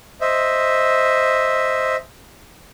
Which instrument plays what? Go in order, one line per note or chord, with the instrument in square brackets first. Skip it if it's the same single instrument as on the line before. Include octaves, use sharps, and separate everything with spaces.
[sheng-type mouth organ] C5 D#5 E5